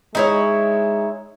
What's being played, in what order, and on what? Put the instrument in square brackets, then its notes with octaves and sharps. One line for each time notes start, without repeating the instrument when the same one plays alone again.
[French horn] G#3 [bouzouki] D#4 E4 C#5